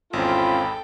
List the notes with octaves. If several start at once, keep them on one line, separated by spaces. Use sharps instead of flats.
G#1 E2 C4 C#4 F4 A4 G5 B5